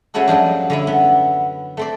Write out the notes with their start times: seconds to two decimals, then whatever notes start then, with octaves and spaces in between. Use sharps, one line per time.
0.14 G#3 A3 C#4 E4 F#4 A4
0.28 F#2 F3 G3 D4
0.70 D3 C#4 E4
0.87 B3
1.77 A3 C4 D5